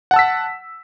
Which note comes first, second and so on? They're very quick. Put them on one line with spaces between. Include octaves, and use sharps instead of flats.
F#5 A5 E6 B6